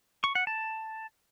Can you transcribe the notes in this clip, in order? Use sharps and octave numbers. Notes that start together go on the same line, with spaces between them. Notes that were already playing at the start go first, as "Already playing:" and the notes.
C#6
F#5
A5